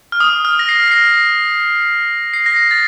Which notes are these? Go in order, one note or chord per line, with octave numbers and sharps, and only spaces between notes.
F6
D#6
F6
A#6
C7
A#6
C7
C7
A#6
C7
A6